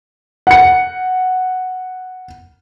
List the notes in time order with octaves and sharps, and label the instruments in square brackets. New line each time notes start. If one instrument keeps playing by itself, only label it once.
[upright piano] F#5 C#7